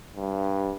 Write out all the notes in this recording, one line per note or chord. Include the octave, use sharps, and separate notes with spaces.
G2